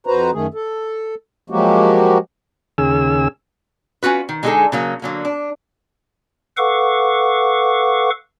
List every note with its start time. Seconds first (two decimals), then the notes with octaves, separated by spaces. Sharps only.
0.07 F2 F#4 B4 C5 A#5
0.33 F#2 D#3 A3 G#4
0.54 A4
1.50 F3 F#3 G#3 A#3 F#4 G4
2.78 D#2 C#3 G#4 E6
4.03 C#4 F4 F#4 B4
4.29 D#3
4.43 D3 G#3 D#4 F#4 G#4 A4
4.72 C#3 F#3 A#3
5.02 D3 F#3 A#3
5.25 D4
6.57 A4 B4 F5 F#5 C#6 D6